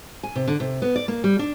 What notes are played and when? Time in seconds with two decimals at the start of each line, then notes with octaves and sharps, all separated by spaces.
0.23 G#5
0.36 C3
0.48 D3
0.60 C3
0.82 B3
0.96 D5
1.08 A#3
1.24 G3
1.39 D4